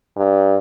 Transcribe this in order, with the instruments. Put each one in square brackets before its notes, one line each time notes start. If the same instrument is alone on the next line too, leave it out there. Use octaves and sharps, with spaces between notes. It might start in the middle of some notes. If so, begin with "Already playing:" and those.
[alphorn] G2